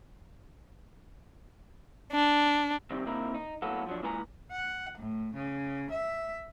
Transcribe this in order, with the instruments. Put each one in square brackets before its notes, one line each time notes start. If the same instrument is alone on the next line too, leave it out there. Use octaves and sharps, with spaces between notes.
[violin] D4
[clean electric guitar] C3 D#3 G3 C4
D3 A#3 C4 D#4 E4 A#4
D#4
A2 F#3 A#3 B3 F#4 A4
F3 F#3 D4
A#2 E3 G#3 B4 G#5 A#5
[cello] F#5
A2
C#3
E5